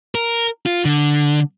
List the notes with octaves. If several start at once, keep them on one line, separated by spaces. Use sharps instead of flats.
A#4
F4
D3